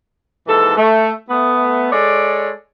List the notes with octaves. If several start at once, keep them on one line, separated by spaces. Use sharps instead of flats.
D#2 G#2 E3 A4
A3
A3 B3
G#3 A4 C#5 D5